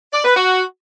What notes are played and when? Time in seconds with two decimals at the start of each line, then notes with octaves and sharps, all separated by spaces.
0.13 D5
0.25 B4
0.36 F#4